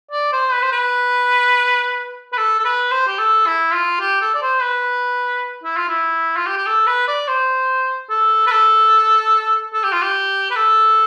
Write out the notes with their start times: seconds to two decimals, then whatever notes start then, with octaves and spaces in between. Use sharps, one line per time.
0.12 D5
0.33 C5
0.53 B4
0.63 C5
0.72 B4
2.33 B4
2.37 A4
2.59 A4
2.65 B4
2.91 C5
3.07 G4
3.18 A4
3.46 E4
3.73 F4
4.00 G4
4.21 A4
4.34 D5
4.42 C5
4.62 B4
5.64 E4
5.77 F4
5.89 E4
6.37 F4
6.46 G4
6.57 G4
6.67 A4
6.87 B4
7.08 D5
7.28 C5
8.09 A4
8.47 B4
8.51 A4
9.73 A4
9.84 G4
9.92 F4
10.02 G4
10.51 B4
10.56 A4